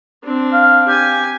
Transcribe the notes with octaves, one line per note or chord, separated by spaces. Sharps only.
C4 D4
F5
G4 G#5